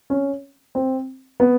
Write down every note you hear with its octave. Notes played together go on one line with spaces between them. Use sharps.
C#4
C4
B3